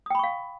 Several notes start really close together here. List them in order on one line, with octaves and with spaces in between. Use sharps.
D#6 G5 B5 C#6 F5